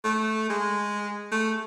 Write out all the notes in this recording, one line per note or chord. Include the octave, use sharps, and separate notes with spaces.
A3
G#3
A3